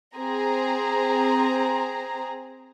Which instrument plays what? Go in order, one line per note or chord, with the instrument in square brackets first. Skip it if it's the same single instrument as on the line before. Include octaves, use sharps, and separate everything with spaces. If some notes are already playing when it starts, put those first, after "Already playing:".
[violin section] C4 G#4 A#5